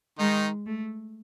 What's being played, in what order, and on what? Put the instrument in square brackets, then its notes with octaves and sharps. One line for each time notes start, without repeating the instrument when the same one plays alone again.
[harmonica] D#3 D#4 [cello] G#3
[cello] A3